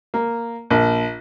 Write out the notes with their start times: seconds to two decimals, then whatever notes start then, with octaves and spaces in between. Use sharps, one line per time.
0.14 A#3
0.70 A#1